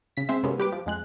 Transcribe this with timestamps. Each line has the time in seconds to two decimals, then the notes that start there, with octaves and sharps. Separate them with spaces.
0.17 C#3 B6
0.29 G#3 C4 C5 E5
0.43 F#2 C3 G#3 A#3 B3 C#4
0.58 G2 G4 B4 D6
0.72 F3
0.86 F2 G#3 F#6